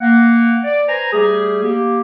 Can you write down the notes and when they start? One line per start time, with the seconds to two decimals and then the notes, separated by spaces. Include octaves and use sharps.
0.01 A#3 F#5
0.64 D5
0.88 B4 C5 G#5 A#5
1.12 G3 A3 G4 G#4
1.62 A#3 G4